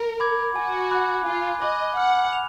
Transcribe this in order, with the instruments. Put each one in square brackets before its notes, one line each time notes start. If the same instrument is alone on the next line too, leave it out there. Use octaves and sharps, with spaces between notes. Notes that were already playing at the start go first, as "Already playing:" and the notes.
Already playing: [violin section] A#4
[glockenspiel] B5 D6 G#6
[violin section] F#4 [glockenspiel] G#5
[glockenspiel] B5 D6 F#6
[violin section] F4 [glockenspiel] G#5
[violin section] D#5 [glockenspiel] B5 D6 F#6
[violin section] F#5 [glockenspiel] F6
[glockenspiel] F7